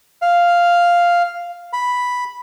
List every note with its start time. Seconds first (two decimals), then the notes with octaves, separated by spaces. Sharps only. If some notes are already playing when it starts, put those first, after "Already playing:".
0.22 F5
1.73 B5